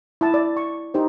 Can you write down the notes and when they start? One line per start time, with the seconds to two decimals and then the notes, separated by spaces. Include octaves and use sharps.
0.21 E4 A5
0.34 D5
0.57 C#6
0.94 D#4 G4 C5